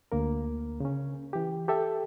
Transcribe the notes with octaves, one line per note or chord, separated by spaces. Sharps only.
D2 A#3 A#4
C#3 C#4
E3 G4
G4 A4 E5 G5